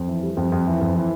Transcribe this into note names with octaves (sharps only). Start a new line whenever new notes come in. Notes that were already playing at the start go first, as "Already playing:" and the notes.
Already playing: F2
E3
G3
F2
F2
E3
F2
E3